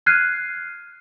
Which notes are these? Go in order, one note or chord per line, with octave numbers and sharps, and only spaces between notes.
F6 F#6 G#6 C7 D#7